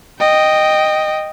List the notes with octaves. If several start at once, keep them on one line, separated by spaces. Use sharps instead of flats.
D#5 G5